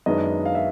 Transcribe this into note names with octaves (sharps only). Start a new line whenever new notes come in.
F#2 D#3 G#3 B3 D4 D#5
F5
E5